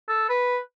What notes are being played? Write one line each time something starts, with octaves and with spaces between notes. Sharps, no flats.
A4
B4